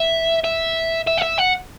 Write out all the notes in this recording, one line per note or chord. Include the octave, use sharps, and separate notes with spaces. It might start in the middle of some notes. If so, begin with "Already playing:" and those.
Already playing: E5
E5
E5
F#5
E5
F#5